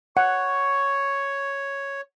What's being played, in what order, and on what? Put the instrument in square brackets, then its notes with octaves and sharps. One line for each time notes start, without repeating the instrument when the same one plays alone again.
[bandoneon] C#5 [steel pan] F#5 [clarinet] C#6